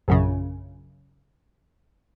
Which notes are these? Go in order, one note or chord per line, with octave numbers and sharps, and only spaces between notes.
A#1 F#2 C#3